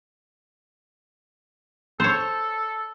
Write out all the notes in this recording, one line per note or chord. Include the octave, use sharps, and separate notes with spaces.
A4 C5 C#5